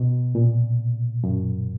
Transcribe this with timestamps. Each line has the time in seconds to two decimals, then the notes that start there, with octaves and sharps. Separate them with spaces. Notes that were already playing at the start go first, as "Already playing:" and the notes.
Already playing: B2
0.35 A#2
1.24 F#2